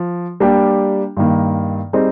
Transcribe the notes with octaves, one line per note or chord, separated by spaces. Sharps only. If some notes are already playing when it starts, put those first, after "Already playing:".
Already playing: F3
G3 A#3 D4 G4
G2 D#3 A#3
G3 C4 D#4 G#4